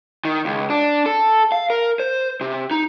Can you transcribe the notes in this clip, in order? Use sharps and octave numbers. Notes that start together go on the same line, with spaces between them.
D#3
C#2
D4
A4
F5
A#4
C5
C3
D#4